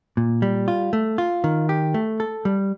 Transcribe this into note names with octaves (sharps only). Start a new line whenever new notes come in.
A#2
G3
F4
A3
F4
D#3
G4
A3
A4
G3